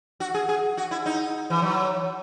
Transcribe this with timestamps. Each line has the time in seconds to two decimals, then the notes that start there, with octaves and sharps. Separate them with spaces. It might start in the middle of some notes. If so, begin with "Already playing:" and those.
0.20 F#4
0.34 G#4
0.49 G#4
0.77 F#4
0.91 E4
1.06 D#4
1.50 E3
1.62 F#3